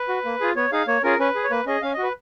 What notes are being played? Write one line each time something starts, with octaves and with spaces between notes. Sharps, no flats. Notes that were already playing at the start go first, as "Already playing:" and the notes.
Already playing: B4
F#4
A#3
F4 G#4
B3 C#5
D#4 G#4 F5
A#3 C#5
C#4 F4 G#4 A#4
C#4 B4
G#4
C#5
A#3 B4
C#4 G#4 D#5
C#4 F5
F#4 D#5
B4